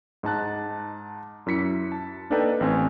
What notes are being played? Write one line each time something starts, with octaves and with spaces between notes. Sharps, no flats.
G#2 D#4 A5 F#6
F#2 E4 B6 C#7
A5
A#3 D4 D#4 A4 B4 G5
A1 C4 G#5